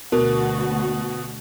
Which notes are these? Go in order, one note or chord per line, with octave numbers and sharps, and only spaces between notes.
D2 B2 F#4 A#4